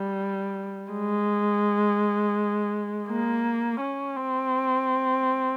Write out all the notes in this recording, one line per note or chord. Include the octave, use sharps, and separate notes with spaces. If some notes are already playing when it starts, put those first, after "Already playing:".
Already playing: G3
G#3
A#3
C#4
C4